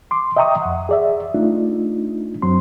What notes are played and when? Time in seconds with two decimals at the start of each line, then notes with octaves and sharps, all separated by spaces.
0.11 C6 D6
0.36 D#5 E5 G5 A#5 C#6 D#6
0.62 F2 F#5
0.89 G#4 D5 E5
1.34 A3 D4 D#4 F4
2.42 F#2 F#3 C4 C6